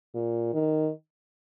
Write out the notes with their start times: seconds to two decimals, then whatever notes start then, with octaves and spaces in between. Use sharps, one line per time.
0.15 A#2
0.54 D#3